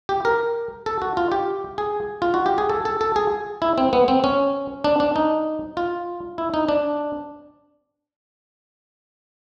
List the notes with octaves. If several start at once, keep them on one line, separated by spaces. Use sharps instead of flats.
G4
A#4
A4
F#4
F4
G4
G#4
F4
F#4
G4
G#4
A4
A4
A4
G#4
E4
C4
B3
C4
C#4
D4
D4
D#4
F4
E4
D#4
D4